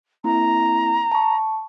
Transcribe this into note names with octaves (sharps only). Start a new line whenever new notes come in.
A#3 C4 E4 A#5
A5 C#6